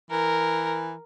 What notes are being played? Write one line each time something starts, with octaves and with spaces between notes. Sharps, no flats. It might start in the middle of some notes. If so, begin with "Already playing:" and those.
E3 A#4